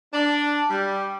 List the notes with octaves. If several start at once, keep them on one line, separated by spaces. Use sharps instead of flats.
D4
G3